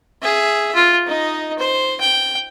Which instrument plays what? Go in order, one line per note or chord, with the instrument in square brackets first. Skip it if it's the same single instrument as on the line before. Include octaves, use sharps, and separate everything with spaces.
[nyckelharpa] G#4 E5
F4
D#4 D#5
C5
G5